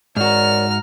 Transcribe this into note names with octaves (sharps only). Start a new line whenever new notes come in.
G#2 F#4 A#4 C#5 D5 A#5 F6